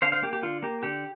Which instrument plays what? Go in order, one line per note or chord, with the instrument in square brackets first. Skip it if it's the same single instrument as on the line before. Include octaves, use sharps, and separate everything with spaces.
[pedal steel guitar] D3 C5 F5
C5 F5
A#3 G4
G4
D3 F4
A#3 G4
D3 G4